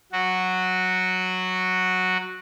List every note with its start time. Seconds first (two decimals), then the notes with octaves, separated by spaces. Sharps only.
0.12 F#3 F#4